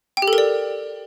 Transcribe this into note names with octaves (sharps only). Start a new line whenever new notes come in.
G5
G4
A4
A#4
D5